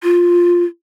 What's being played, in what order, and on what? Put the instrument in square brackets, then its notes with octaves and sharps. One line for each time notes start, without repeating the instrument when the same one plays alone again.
[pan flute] F4